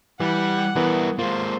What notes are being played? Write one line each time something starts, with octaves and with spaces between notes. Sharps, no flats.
E3 G3 F#5
E3 G3 B3 A#4
G#3 A#3 F4 C5